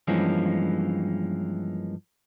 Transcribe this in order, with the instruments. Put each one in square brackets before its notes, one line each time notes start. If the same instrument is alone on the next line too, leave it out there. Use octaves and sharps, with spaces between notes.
[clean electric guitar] G2 E3 F3 G#3 A#3 C#4